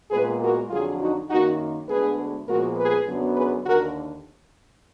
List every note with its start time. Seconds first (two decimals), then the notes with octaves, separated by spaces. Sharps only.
0.11 A#2 G#3 B3 G#4 B4
0.41 F#4 A#4
0.70 F2 D3 F#3 F4 G#4
1.00 D#4 F#4
1.29 F#2 D#3 A#3 D#4 F#4
1.88 D2 D3 G#3 B3 G#4 B4
2.47 A#2 F3 G#3 B3 F#4 A#4
2.77 G#4 B4
3.07 F#2 D3 F#3 B3
3.36 G#4 B4
3.66 D#2 D3 F#4 A#4